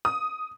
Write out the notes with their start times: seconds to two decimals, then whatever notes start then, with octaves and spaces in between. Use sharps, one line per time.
0.05 D#6